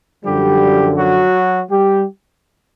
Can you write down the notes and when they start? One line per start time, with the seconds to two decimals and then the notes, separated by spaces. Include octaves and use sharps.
0.25 F#2 D3 F3 G3 G4
0.97 F#3 F#4
1.71 G3 G4